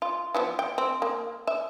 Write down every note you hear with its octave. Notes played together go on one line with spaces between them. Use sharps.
F4
E3 F3 B3
G5
C4
A#3
E5